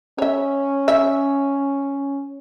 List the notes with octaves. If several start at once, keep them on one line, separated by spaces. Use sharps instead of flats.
C#4 C#5 E5
E5